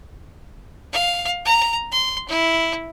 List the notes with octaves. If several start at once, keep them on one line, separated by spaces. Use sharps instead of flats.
F5
A#5
C6
E4